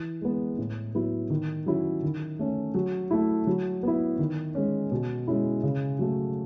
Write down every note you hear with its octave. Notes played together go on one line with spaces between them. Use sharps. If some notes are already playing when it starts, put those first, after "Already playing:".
Already playing: E3
G#3 B3
A2
F#3 B3 E4
D#3
F#3 C#4 E4
D#3
A3 C#4
F#3
A3 E4
F#3
B3 E4
D#3
G#3 C#4
B2
G#3 C#4 E4
C#3
F#3 A3